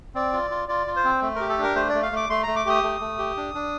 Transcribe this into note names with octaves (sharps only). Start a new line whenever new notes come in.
C4 D5
F4
F4
F4 D5
F4
C5
C4
A3
G4 A#4
A4
D4 A#4
A3 C5
A3 D5
F5
A3 D6
A3 C6
A3 A#5
D6
G4 D#6
A3
A3
G4
D4
D4